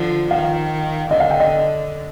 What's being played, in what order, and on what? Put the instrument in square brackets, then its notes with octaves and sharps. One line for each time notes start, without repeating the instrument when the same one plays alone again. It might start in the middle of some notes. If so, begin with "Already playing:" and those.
Already playing: [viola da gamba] D3 F3
[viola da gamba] D#3 [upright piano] F5
[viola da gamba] D3 [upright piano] D#5
[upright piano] F5
G5
D#5